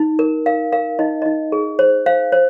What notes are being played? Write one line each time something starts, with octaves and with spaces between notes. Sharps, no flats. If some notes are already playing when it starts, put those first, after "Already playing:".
Already playing: D#4
A#4
A#4 F5
A#4 F5
D#4 D#5
D#4 D#5
G#4
C5
C5 F5
C5